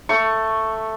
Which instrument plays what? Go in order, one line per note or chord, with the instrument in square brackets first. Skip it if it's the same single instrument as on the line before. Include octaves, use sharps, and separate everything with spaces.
[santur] A3 C#6